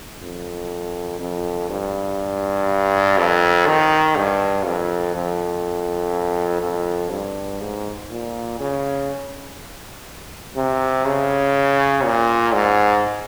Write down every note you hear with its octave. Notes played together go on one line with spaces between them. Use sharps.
F2
F2
G2
F2
D#3
G2
F2
F2
F2
G2
G#2
A#2
C#3
C3
C#3
A#2
G#2